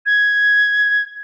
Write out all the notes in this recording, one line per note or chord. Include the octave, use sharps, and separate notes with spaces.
G#6